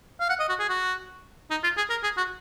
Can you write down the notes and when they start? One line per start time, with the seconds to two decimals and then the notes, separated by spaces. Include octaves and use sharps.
0.20 F5
0.30 F#5
0.40 D#5
0.49 F#4
0.60 G#4
0.69 F#4
1.51 D#4
1.64 F4
1.77 G#4
1.90 A#4
2.04 G#4
2.17 F#4